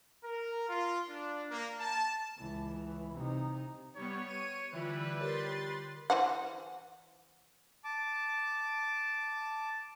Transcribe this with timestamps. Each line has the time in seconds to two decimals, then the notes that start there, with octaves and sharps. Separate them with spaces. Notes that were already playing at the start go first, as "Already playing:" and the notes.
0.25 A#4
0.69 F4
1.09 D4
1.51 A#3
1.80 A5
2.38 C#2 E3
3.17 C3 D#4
3.96 G3 B3 C#5
4.28 D#7
4.72 D3 E3 G3 E4 F4 B4
5.20 G4 A#4 C#5 C6 A6
6.10 E3 C5 F#5
7.84 A5 D6